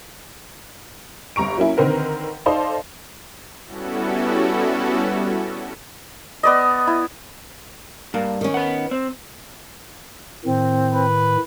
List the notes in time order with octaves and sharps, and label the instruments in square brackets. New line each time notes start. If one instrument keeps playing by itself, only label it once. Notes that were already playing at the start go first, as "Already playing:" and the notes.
[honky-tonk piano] G1 G2 A#5 C#6 D7
F#3 A#3 C#4 E4
D3 D#3 C4 A#4 B4
D#4 A4 C5 D5 D#5 F5
[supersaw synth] G3 B3 C#4 E4 F#4 A4
[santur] B3 D5 D#5
E4
[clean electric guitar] G2 [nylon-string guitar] A#3
[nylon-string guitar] D#3 C#4
[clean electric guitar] B4 F#5
C4
[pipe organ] A2 D#3 [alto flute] C4
[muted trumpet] B4